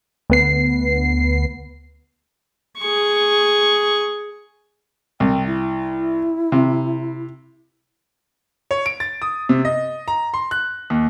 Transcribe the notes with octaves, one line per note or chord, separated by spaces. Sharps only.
D2 B3 C7
G#4 C#6
C2 G5
E4
C3
C#5
D7
A6
D#6
C3
D#5
A#5
C6
F#6
D#2